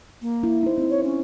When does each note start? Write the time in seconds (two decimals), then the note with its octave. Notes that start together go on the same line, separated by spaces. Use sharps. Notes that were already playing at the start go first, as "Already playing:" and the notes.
0.22 A#3
0.43 E4
0.63 D#4 C5
0.78 C4 E4
0.90 C#5
1.03 C#4